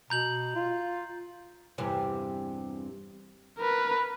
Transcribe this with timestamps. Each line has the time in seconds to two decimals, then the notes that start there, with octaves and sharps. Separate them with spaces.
0.10 B2 A#5 G6 F#7
0.55 F4
1.78 E2 G2 C3
3.58 A#4 B4